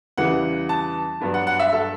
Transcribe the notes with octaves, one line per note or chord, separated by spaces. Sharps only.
E2 C#3 E3 G3 F#5
A5
G2 F#3 B3 D4
F#5
F#5
E5
A4